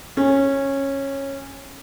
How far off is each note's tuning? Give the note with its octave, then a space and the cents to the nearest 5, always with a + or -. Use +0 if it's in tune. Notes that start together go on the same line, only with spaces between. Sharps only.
C#4 -15